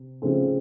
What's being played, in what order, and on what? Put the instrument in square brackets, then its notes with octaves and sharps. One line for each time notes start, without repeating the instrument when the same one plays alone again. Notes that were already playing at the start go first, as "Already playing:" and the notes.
Already playing: [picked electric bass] C3
[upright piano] C#3 F3 A3 C4